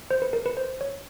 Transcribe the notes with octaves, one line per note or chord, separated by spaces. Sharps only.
C5
B4
A#4
B4
C5
C#5